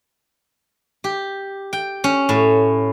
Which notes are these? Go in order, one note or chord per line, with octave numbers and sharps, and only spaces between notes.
G4
G5
C#4
A2